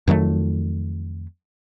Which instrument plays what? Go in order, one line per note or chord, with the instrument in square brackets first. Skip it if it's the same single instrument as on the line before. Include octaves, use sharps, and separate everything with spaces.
[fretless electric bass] F2 D#3 F#3 A3